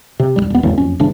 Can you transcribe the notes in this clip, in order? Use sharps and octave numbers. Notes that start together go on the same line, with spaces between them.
C3
E1 B1 G3
D#1 B3
G#1 E2 A2 C#3
F#1 F2 C#4
G1 C#3 E3 D4